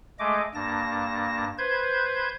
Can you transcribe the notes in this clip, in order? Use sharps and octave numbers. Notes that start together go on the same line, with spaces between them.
G#3 A3 D#5 D6
G2 A#3 A5 A#6
B4 C5 G6 G#6